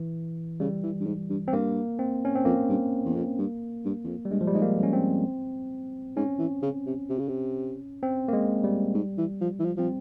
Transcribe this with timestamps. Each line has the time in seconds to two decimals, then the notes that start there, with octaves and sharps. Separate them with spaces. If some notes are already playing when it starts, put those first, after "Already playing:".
Already playing: E3
0.60 C#3 G3
0.83 E3
1.01 G2
1.06 G#2
1.30 G2
1.48 C4
1.53 G2 A#3
1.99 C4
2.25 C#4
2.35 C4
2.45 F2 A#3
2.69 G2
3.05 E2
3.15 F2
3.38 G2
3.85 G2
4.04 E2
4.08 F2
4.25 G3
4.31 G2 G#3
4.41 F3
4.47 G3
4.54 G#2 G#3
4.62 A#3
4.78 F2
4.83 C#4
4.93 C4
6.16 G#2 C#4
6.39 E3
6.62 C#3
6.86 C3
7.10 C3
7.19 C#3
7.28 C3
8.03 C4
8.28 A#3
8.33 G#3
8.64 G3
8.95 G#2
9.18 E3
9.41 F3
9.60 E3
9.65 F3
9.77 F3 C4